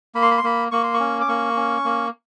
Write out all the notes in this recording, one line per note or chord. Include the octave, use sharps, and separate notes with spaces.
A#3 B5
C6
B5
C6
A#3 B5
A#3 C#6
C6
C#6
C#4
D6
A#3 C#6
C#4
A#3